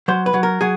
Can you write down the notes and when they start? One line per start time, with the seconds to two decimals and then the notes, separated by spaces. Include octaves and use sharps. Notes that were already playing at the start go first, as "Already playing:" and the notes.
0.08 F#3 C5
0.26 B4
0.34 F#3
0.43 A#4
0.61 F#3 G#4